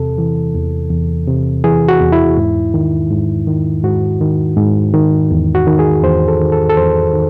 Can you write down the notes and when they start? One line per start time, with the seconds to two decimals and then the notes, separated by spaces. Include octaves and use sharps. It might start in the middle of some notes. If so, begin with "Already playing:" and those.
Already playing: E2 C3 A4
0.18 E3
0.55 E2
0.90 E2
1.27 C3
1.64 E3 G#4
1.88 F#4
2.01 E2
2.12 E4
2.37 G#2
2.74 D#3
3.11 G#2
3.47 D#3
3.84 G#2 F#4
4.21 D#3
4.57 G#2
4.94 D#3
5.31 E2
5.55 F#4
5.67 D#3
5.79 G#4
6.03 E2 C5
6.28 A4
6.40 D#3
6.52 A4
6.70 A4
6.77 E2 C5
7.13 D#3